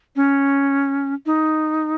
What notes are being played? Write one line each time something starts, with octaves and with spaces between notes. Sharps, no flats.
C#4
D#4